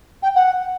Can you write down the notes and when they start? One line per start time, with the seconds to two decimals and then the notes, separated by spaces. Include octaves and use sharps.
0.22 G5
0.35 F#5